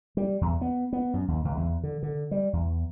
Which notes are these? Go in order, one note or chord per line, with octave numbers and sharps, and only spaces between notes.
G3
E2
B3
B3
F#2
D#2
C#2
E2
D3
D3
G3
E2